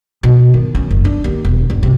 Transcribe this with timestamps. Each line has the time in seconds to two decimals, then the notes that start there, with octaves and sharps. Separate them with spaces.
0.23 B2
0.54 D#3
0.75 C#4
0.91 F#1
1.05 D4
1.24 D#2
1.45 E1
1.70 G1
1.83 C3